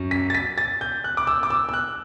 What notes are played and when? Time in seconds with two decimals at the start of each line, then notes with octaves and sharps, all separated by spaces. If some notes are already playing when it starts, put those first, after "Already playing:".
Already playing: F#2
0.11 B6
0.30 A6
0.34 B6
0.58 A6
0.81 G6
1.04 F#6
1.17 D6
1.27 E6
1.43 D6
1.50 E6
1.69 E6
1.73 F#6